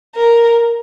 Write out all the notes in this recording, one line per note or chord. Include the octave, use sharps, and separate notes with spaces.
A#4